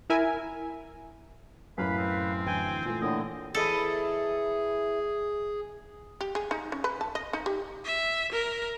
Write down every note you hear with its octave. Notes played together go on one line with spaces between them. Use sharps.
E4 A#4 E5 G#5
F#2 A2 B4 F5 B5
C4
D2 E3 G5 G#5
A#2 E3 A3 F4
A2 D3 A#3 E4 D#5
E2 E4 G#4 A4 D#5
G4
G#4
D#4
C#4
B4
A5
D#5
D#4
G4
E5
A#4